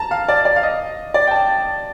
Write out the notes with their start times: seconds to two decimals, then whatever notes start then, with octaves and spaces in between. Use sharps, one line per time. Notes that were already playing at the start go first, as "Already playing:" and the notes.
Already playing: A5 A#5
0.11 F5
0.29 D5
0.45 D5
0.56 F5
0.63 D#5
1.14 D5
1.27 G5
1.31 A5